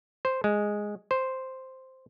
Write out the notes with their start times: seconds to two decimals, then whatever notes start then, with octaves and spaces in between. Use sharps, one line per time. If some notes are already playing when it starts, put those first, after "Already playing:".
0.25 C5
0.44 G#3
1.11 C5